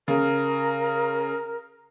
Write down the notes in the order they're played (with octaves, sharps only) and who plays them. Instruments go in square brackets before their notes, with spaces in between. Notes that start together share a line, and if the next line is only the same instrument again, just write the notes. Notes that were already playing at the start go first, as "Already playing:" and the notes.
[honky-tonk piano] C#3 [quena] A#4